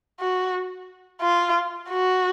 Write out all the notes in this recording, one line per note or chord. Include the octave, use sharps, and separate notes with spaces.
F#4
F4
F#4